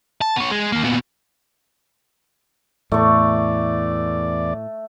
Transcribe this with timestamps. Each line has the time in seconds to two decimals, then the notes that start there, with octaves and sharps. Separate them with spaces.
0.21 A5
0.36 B3 C#5
0.51 G#3
0.72 D#2 A#3
0.84 A#2 B3
2.92 E2 A2 A3 D5 C#6